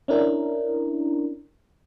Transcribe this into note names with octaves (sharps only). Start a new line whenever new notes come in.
C#4 D4 E4 A#4